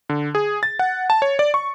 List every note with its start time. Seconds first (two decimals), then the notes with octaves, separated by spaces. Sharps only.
0.09 D3
0.35 G#4
0.63 A6
0.79 F#5
1.10 A5
1.22 C#5
1.39 D5
1.54 C#6